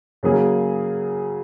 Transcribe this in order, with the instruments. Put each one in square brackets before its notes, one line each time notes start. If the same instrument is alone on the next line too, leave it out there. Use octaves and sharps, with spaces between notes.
[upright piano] C#3 F#3 A#3 C#4 G#4